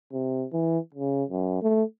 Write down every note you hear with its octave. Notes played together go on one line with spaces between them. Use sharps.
C3
E3
C#3
F#2
A3